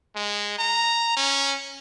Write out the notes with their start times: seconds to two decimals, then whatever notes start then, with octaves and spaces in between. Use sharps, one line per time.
0.16 G#3
0.58 A#5
1.17 C#4